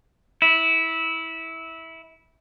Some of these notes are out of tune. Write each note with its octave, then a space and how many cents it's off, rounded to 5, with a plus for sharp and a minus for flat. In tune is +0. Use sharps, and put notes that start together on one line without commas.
E4 -15